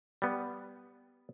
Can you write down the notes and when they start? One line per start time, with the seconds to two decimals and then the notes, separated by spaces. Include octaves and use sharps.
0.22 G3 B3